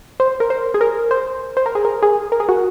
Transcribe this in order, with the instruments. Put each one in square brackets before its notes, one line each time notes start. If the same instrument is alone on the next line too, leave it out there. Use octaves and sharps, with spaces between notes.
[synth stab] C5
A#4
C5
G#4
A#4
C5
C5
A#4
G#4
A#4
G#4
A#4
G#4
F#4